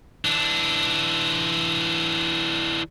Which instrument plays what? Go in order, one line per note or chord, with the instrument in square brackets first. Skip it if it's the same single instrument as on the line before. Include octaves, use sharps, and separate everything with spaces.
[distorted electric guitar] E3 D4